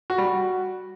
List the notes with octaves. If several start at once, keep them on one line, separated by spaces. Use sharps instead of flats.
F#4
G3
F#4